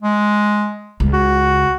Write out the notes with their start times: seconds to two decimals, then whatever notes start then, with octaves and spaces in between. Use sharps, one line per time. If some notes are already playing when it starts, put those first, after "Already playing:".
0.02 G#3
1.00 C#2
1.13 F#4